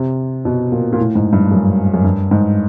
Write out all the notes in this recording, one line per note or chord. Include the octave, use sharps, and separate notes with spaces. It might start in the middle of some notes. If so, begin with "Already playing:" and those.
Already playing: C3
B2
A#2
A#2
A2
G#2
G2
F#2
F#2
G2
G#2